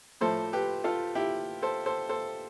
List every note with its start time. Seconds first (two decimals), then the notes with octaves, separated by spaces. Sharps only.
0.21 A2 F3 A3 A4 C5
0.53 G4 B4
0.84 F4 A4
1.15 E4 G4
1.62 A4 C5
1.86 A4 C5
2.09 A4 C5